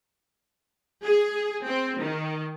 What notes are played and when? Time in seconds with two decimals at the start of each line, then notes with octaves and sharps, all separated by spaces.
1.03 G#4
1.66 C4
2.00 D#3